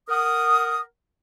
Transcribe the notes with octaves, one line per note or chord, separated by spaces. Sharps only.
A#4 F#5 D#6